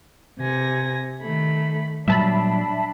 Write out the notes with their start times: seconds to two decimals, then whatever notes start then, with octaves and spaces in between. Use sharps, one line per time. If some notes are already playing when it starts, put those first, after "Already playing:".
0.39 C3 G#5 A#6
1.22 D#3 A3 B5
2.08 A#2 F#3 G3 D4 E5 A5 B5